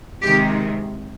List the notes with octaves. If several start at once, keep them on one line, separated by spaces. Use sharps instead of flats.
C3 D#3 G#3 G4